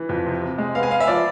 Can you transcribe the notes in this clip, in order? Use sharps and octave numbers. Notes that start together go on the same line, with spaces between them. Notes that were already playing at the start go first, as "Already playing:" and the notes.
Already playing: E3
F2
C3
C3
G#3
B3 F5
G#5
B3 F5
E5
F3 D5